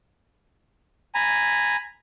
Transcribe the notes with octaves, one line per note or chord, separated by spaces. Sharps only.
G#5 A#5 B5